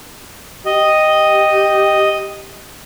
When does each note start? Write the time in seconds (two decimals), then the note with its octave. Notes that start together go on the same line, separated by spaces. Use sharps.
0.66 G4 D#5